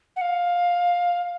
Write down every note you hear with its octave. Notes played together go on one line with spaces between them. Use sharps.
F#5
F5